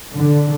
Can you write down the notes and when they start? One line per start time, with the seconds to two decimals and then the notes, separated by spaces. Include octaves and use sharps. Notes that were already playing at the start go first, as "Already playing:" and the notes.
0.13 D3